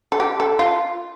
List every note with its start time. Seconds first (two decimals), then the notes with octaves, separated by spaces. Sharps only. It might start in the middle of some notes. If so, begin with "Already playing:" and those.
0.12 A4
0.20 G4
0.40 A4
0.59 F4